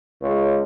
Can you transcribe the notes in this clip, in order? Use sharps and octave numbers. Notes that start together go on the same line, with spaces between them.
C#2